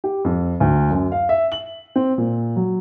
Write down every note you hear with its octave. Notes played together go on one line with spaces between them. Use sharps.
G4
F2
D2
F#2
F5
E5
F#7
C4
A#2
F#3